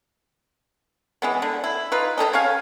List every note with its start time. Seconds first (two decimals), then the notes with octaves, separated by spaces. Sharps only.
1.22 E3 G#3 B3
1.42 D3
1.64 E4
1.92 D#4 F4 B4
2.17 D#3 C#4 A4 D#5
2.33 C#3 C#5 F5 G#5